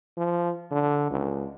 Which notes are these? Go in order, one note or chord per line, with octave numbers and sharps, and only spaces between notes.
F3
D3
C#2